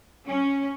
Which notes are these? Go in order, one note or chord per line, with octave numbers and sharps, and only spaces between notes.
C#4